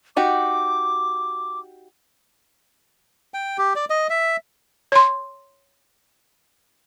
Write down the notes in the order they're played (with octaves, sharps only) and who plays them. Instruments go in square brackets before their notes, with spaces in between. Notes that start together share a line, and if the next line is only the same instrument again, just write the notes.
[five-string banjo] D#4 F#4 G4 [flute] D6
[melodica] G5
G4
D5
D#5
E5
[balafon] C#5 C6